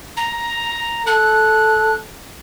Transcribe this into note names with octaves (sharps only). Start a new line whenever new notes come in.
A#5
A4 F#6